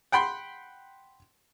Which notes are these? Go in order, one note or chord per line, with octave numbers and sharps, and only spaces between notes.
F#5 G5 B5 C6